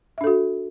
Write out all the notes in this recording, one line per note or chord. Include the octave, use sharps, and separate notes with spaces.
D4 F#4 A4 E5